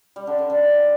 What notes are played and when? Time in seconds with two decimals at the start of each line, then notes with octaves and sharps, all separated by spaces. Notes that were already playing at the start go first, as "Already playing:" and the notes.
0.16 G3
0.27 D3
0.38 D3
0.50 D3